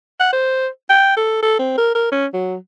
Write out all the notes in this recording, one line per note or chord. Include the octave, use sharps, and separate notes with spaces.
F#5
C5
G5
A4
A4
C4
A#4
A#4
C#4
F#3